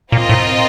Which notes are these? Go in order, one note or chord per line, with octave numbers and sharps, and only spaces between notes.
A#2 C4 F4 A#4 D#5
A2